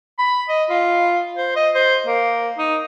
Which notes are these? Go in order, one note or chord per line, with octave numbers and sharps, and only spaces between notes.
B5
D#5
F4
C5
D#5
C5
A#3
D#4